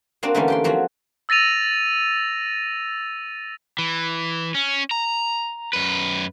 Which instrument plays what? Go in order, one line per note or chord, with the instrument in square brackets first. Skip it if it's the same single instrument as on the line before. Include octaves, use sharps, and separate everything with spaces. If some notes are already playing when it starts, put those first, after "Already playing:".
[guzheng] A#3 C4 D4 F#4
D3 E3 G3 A3 A#3 C#4
G4 G5 C6
F3 F#3 C4 F#4
[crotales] E6 A6 A#6 D#7 F7
[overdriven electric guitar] E3
C#4
A#5
F#2 B4